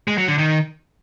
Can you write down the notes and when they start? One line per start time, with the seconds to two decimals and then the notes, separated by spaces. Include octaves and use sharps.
0.08 G#3
0.18 F#3
0.28 D3
0.38 D#3